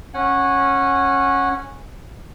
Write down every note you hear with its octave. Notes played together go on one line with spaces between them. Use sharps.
C#4 F#5 G#5